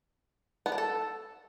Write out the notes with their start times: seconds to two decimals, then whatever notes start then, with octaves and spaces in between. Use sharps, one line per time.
0.66 B3
0.72 D4
0.78 A4